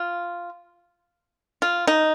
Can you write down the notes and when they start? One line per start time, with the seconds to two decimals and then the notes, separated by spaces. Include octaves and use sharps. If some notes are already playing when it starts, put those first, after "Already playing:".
Already playing: F4
1.62 F4
1.87 D#4